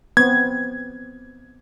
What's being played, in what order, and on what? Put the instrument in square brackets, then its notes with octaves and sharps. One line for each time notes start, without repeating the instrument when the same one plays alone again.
[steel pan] B3 C4 [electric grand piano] G#6